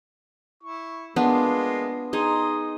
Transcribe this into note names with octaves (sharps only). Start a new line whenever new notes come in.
E4 C#6
G#3 A#3 B3 D4 F4
D#4 G#4 D#5 C6 D#6